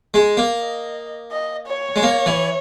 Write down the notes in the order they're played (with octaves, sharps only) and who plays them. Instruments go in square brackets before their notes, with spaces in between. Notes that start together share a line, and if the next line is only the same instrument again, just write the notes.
[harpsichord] G#3
A#3
[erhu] D#5
D#5
C#5
[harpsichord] G#3
A#3
E3